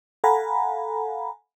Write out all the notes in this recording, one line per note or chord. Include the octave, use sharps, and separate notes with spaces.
A4 F5 F#5 G#5 A#5 B5